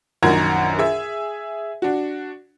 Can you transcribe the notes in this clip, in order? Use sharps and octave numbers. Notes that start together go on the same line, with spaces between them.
A#1 F#2 D#3 F#5 A#5 G#6
G#4 E5
D4 F#4